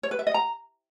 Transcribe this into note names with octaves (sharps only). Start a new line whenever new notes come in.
C#5
B4
E5
D#5
A#5